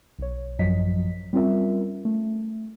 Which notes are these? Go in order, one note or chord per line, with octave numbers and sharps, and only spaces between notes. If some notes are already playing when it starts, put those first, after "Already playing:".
B1 C#5
A1 F#2 F3 F#3 D#5 B6
G3 C4 C#4 F4 A#4 E5
A3